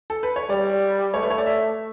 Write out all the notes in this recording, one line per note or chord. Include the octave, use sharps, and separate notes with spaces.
A4
B4
C#5
G3 D5
A3 C#5
B4
C#5
D5
E5